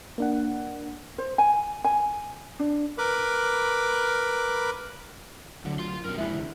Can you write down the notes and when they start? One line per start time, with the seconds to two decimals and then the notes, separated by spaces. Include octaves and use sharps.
0.18 A#3 D4 F#5
1.18 C5
1.38 G#5
1.84 G#5
2.59 D4
2.98 A#4 B4 B5 D6
5.65 D2 D3 F#3
5.79 F4 C6
6.05 F#2 B2 D3 A#4 F6
6.18 F1 A#1 E2 E3 G#3 E4 E5 F#6
6.31 C2 D3